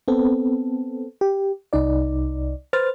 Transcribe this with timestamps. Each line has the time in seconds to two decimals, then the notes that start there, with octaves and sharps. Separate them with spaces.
0.08 B3 C4 A4
1.21 G4
1.73 C2 D#4 D5
2.73 B4 C5 F6 A6